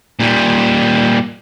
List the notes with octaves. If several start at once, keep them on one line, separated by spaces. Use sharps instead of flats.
A#2 G3